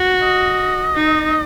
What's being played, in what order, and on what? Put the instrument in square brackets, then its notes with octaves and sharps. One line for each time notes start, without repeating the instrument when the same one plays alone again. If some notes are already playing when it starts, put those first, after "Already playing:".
Already playing: [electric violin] F#4
[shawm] D#5
[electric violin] D#4